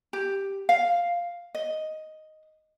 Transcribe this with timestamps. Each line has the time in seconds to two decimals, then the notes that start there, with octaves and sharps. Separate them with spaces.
0.13 G4
0.69 F5
1.55 D#5